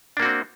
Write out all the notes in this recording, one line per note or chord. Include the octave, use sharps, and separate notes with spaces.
A#3 C4 D4 F#4